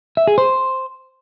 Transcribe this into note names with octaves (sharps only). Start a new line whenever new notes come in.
E5
G#4
C5